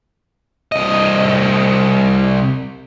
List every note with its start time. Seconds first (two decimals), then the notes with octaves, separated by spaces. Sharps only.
0.72 C2 D#5